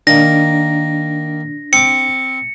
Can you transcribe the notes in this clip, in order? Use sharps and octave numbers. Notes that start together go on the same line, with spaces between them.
D#3 A#3 D4 A#6
C4 D6 C#7